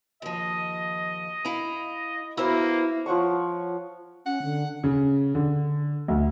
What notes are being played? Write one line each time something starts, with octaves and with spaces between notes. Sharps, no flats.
D#2 F3 D#5
E4 F5 A#5
A#3 B3 E4 F#4 C5
F3 C#5 F#5 C#6
C#4 F#5
D3
C#3
D3
D2